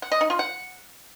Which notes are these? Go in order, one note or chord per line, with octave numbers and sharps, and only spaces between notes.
F#5
D#5
D#4
F4
F#5